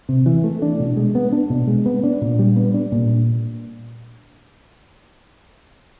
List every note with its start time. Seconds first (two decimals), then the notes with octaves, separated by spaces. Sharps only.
0.09 C3
0.26 E3
0.44 A3
0.62 D4
0.80 B2
0.97 G#3
1.15 B3
1.32 D4
1.50 B2
1.67 G#3
1.86 B3
2.04 D4
2.21 A#2
2.39 G3
2.56 B3
2.74 D4
2.92 A#2